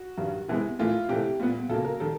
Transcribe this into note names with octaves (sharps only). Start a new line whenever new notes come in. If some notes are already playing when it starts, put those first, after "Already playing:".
Already playing: F#4
G2 D#3 G3
C3 E3 G#3 B3
A2 E3 A3 F4
C3 E3 A3 G4
A#2 G3 B3
C#3 F#3 A#3 A4
A#4
D#3 G3 A4